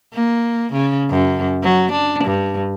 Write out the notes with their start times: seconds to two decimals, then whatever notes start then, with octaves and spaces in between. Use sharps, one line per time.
0.14 A#3
0.73 C#3
1.10 F#2
1.63 F#3
1.92 D4
2.24 G2